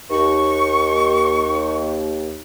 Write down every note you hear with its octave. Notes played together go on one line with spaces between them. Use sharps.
D#2 C#6